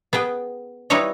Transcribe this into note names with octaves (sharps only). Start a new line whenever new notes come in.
B3 G#4 B4 G5
G3 D#4 E4 B4 C#5 D#5